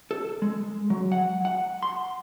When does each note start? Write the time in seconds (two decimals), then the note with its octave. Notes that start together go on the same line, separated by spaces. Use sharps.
0.11 A4
0.42 G#3
0.90 F#3
1.12 F#5
1.45 F#5
1.83 C6